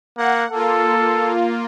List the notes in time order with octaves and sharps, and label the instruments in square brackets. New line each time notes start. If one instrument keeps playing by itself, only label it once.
[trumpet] A#3 [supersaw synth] F#5
[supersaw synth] A#3 F4 [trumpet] A4